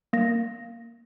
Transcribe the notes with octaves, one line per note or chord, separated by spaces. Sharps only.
A#3 A#6